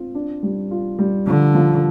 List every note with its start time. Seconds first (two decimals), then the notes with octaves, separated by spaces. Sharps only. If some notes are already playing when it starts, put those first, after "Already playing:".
Already playing: C4 F4
0.15 D4
0.43 G3
0.71 F4
0.99 G3
1.27 D3 F3
1.55 F3